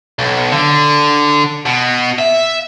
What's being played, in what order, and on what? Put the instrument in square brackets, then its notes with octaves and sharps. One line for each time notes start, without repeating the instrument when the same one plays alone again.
[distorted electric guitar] B1
D3
B2
E5